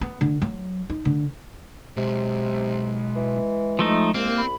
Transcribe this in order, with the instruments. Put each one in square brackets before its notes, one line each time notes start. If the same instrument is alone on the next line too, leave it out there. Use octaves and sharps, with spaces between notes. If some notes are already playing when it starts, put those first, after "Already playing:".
[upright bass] B3
D3
F#3
D#4
D3
[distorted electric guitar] B1 [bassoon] C3 [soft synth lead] G#3
[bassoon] E3
[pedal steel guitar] F3 A3 D#4
[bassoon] C2 [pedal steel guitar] A#3 [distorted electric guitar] C4
[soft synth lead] B5